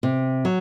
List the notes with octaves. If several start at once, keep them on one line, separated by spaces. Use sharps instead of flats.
C3
F#3